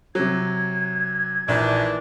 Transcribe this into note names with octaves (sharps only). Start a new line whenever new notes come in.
C3 F#3 G#6
A#1 D#3 E3 D4